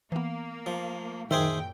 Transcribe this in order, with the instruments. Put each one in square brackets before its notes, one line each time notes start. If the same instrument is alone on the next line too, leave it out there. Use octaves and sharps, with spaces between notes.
[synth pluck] E3 B3 [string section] A#3
[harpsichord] F3
[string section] F#2 A#2 G5 [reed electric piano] D#3 [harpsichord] G#4 C5 E5